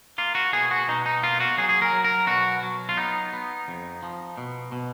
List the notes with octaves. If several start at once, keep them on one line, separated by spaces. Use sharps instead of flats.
A#3 F4
F#4
B2 G#4
F#4
B2 D#4
D#4
A#3 F4
F#4
F#3 G#4
G#4
A#4
F#3
A#4
B2 F#4
F#3
F4
B3 D#4
B3
F2
F3
B2
B2